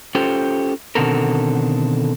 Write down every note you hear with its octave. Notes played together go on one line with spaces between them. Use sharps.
C#4 F4 G4 A4 C5
B2 D3 D#3 C4 A4 A#4